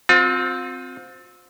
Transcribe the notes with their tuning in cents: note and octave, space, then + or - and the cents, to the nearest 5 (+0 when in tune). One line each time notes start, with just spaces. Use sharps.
C4 -5 F4 +35